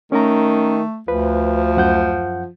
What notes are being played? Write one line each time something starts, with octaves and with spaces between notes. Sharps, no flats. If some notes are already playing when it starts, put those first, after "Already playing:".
D#3 A3 C#4 A#5
D2 F3 B4
F#2 F#5 G6